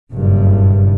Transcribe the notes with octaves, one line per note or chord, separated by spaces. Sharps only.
F#1 G2 A#2